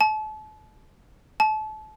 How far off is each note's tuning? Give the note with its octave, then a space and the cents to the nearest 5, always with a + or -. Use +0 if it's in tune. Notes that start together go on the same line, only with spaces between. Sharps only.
A5 -35
A5 -30